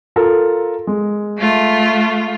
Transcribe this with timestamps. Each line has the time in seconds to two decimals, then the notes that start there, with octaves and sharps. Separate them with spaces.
0.16 F4 A4 A#4
0.87 G#3
1.38 A3 F4